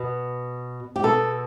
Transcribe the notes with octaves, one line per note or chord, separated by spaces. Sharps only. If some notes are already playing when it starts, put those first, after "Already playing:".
Already playing: B2
G4
B2 A4